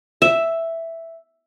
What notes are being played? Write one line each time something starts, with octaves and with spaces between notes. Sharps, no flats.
E5